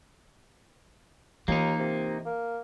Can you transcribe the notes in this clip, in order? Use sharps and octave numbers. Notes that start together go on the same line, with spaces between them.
D#2 E3 A#3 D#4 F4
C3
A#3